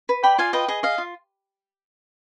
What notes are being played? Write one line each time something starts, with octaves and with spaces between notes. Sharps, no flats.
B4
D5 G5 B5
F4 F5 G#5
B4 D#5 G5
G#4 D#5
D#5 F5
F4